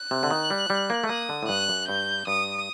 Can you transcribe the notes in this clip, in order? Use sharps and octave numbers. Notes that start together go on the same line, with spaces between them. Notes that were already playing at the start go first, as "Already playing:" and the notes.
Already playing: F#6
C3
D3
D#3
G3
G3
A#3
A3
A#3 D#6
D3
A2
G2 F#6
F#2
G2 G6
G2 D#6